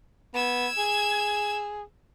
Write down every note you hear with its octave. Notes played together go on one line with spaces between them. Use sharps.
B3 E6 G#6
G#4